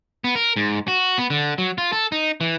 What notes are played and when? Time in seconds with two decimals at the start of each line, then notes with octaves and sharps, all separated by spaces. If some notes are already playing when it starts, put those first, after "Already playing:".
0.24 B3
0.35 A#4
0.56 G#2
0.88 F#4
1.18 B3
1.30 D3
1.58 F#3
1.78 F4
1.92 A4
2.12 D#4
2.41 E3